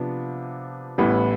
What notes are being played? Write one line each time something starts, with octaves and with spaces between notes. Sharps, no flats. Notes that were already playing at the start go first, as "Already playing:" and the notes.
Already playing: C3 F3 B3 D4
A1 A2 E3 G3 B3